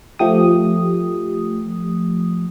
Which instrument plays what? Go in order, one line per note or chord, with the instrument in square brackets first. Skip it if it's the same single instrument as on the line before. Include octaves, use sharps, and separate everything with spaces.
[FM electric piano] F3 A3 G4 D#6